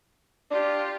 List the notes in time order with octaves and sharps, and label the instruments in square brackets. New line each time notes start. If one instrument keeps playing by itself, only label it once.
[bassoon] D4 [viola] F4 G4